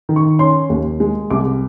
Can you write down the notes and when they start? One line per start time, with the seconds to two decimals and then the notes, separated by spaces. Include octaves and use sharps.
0.09 D#3
0.16 C#6
0.39 C#4 C6
0.70 D#2
1.00 G#3
1.30 C2 D6